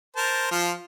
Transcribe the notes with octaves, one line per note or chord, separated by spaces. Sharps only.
A#4 C5 A5
F3 F4